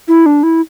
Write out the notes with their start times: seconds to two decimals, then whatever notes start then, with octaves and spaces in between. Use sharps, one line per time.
0.08 E4
0.26 D4
0.43 E4